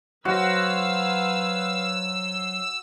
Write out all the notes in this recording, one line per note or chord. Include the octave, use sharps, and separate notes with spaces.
F#3 F#4 B4 C5 F5 E6